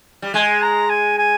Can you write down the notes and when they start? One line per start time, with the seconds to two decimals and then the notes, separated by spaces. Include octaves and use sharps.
0.22 G3
0.34 G#3 G#5
0.62 A#5
0.90 G#5
1.19 G#5